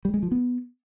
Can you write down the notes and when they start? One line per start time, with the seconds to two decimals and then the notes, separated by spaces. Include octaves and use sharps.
0.05 G3
0.14 G#3
0.23 F3
0.31 B3